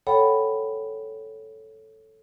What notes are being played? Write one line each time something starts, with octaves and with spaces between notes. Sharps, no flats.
A4 C#5 F#5 G5 B5